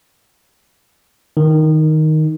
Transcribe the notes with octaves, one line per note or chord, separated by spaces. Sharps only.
D#3